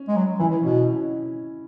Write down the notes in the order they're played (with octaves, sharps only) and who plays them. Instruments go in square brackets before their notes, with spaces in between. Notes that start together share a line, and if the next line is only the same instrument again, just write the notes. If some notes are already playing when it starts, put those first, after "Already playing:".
Already playing: [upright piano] C#4
[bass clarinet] G#3
F#3
[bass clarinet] E3 [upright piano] E4
[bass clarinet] B2 [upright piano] C#4